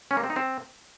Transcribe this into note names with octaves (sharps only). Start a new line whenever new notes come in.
C#4
A#3
C4
D#4
C4